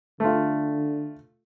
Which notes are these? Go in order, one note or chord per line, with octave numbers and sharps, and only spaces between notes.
D3 A3 F4